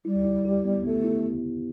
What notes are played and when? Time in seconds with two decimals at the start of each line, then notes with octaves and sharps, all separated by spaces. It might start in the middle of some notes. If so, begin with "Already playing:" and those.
0.05 G3 E4
0.25 E4
0.45 G4
0.64 B3
0.84 A3 B3
1.04 E4